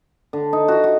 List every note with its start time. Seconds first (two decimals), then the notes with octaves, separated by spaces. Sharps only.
0.33 D3
0.53 D#4
0.68 F#4
0.84 F#4